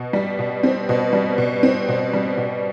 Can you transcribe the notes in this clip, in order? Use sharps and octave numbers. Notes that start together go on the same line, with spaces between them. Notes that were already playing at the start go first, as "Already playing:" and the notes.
Already playing: B2
G3
B2
C4
B2
G3
B2
C4
B2
G3
B2